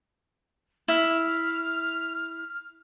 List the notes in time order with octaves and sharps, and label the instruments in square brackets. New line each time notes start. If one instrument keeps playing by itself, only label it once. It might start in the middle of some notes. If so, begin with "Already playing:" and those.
[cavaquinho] E4 [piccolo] F6